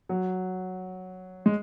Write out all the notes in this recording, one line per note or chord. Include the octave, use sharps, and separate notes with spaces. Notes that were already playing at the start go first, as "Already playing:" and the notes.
F#3
G#3